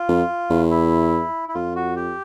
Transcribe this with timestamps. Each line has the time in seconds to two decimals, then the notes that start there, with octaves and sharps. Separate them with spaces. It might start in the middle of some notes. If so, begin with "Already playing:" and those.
Already playing: F4
0.08 F2
0.50 E2
0.71 E4
1.49 E4
1.55 F2 F4
1.76 F#4
1.96 G4